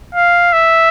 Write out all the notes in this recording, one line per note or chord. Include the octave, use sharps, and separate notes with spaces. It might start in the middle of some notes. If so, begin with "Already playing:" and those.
F5
E5